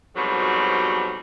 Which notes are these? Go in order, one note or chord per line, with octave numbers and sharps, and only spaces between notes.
F2 G#2 B2 F#3 G3